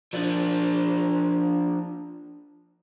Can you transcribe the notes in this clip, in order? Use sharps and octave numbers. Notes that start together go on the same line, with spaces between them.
F3 D4